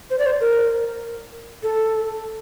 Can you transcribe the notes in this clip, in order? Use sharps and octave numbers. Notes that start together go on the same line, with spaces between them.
C5
D5
C5
A#4
A4